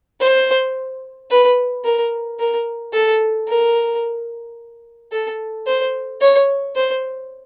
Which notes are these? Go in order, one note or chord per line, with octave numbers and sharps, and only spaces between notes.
C5
B4
A#4
A#4
A4
A#4
A4
C5
C#5
C5